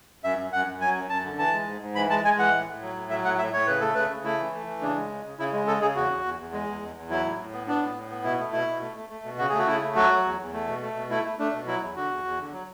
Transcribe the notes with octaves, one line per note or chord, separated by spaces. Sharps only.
F#2 E5
F#2
F#2 F#5
F#2
F#3 G#5
F#2
F#2 A5
D3
E3 A5
G#3
G#2
G#2
E3 B5
G#3 A5
G#3 G#5
E3 F#5
A2
A2
F#3
A2
F#3 E5
A2 F#5
A2 E5
A2 C#5
C#3 B4
A3 A4
C#3 B4
C#3
A3 E4
E3
A3
E3
C#3 D4
G#3
C#3
C#3
C#3 E4
G#3
C#3 A4
C#3 G#4
E2 F#4
E2
E2
E2
G#3
E2
E2
E2
F#3 E4
A2
A2
B3
B3 D4
A2
A2
B3
B2 E4
A3
B2 E4
B2
A3
A3
A3
B2
C#3 F#4
A3 G#4
F#4
C#3 E4
A3
F#3 F#4
F#3
E2
E2
A3
B2
A3
B2
A3 E4
A3
A3 D4
B2
F#3 E4
E2
D3 F#4
E2
E2
D3
F#3